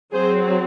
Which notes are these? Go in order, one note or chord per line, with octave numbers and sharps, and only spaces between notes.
F#3 C4 G#4 C5